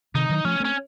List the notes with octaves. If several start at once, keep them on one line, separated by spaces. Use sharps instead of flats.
C3 D#3 D#4
D#3 F#3
F3 A3 C#4
A3 C4 C#4